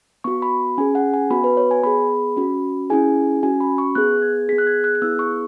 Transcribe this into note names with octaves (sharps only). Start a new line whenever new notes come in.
B3 F#4 C#6
B5
C#4 G#4 G#5
F#5
G#5
B3 F#4 B5
B4
C#5
G#5
B3 G#4 B5
C#4 F#4
C#4 E4 G#4 G#5
C#4 F#4 G#5
B5
C#6
B3 G#4 F#6
G#6
B3 G#4 B6
F#6
G#6
F#6
F#6
B3 E4 G#4 E6
C#6